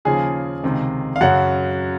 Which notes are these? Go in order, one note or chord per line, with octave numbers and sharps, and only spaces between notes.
D#2 C#3 F3 G#4 G#5
C#2 C3 D#3
F5
F#2 C#3 F#3 F#4 F#5